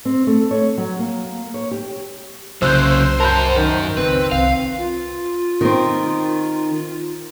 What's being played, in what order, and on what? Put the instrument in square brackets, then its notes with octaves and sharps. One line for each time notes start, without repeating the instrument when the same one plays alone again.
[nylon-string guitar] C4
A3
C#5
F#3
A#3
C#5
G4
[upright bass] C2 [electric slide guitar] C#3 F#3 [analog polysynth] C5 [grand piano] E6 F#6 G6
[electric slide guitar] F#2 A#4 [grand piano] A5 B5 G6
[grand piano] D#3
[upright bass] C#2 [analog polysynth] C4 [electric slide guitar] B4
[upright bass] C2 [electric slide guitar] F5
[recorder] F4
[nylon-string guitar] D#3 C4